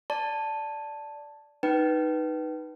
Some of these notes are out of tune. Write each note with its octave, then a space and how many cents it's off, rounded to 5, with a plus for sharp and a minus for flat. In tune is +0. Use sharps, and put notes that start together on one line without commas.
D5 -5 A5 +0
D#4 +0 B4 -5 G5 -30